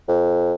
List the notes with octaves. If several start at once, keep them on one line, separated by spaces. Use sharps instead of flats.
F2